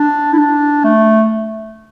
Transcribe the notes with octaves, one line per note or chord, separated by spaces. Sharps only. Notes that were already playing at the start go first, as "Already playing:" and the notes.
Already playing: D4
E4
D4
A3